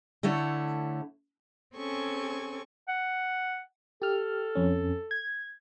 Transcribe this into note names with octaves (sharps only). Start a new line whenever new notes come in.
D3 A3 E4 C#5
C4 C#4 G#4 A4 G#5 C#6
F#5
G4 A4 F6
F2 C#4
G#6